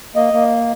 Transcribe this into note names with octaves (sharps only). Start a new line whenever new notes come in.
A#3 D#5
A#3